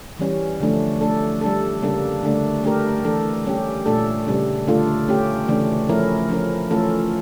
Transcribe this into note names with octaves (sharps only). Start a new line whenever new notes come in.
E3 G3 C#4
D3 F3 A3 D4
A3 D4 A4
G3 D4 A4
C#3 G3 A#3 D4 A4
D3 A3 D4
A3 D4 G4 A#4
E3 A3 D4 A4
G3 C#4 G4
A#2 A3 D4 A4
C#3 G3 D4
D3 A3 D4 F4 A4
A3 C#4 G4
C#3 E3 A3 D4
F3 A3 C#4 E4 A#4
F3 C#4 E4 A#4
E3 A3 C#4 F4 A4